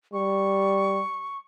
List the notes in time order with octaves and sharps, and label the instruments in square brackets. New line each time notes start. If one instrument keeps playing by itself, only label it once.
[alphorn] G3 [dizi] C#6